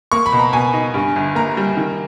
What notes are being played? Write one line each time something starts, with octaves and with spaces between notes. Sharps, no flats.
A#3 C#6
B5
B2
A#5
B2 G#5
D#4
G2
G1
A#3 A#5
G3
D#3